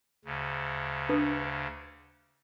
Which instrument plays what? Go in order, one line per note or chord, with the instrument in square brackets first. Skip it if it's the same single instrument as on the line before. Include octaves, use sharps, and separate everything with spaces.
[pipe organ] D2 C#3
[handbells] D4 B4 D#6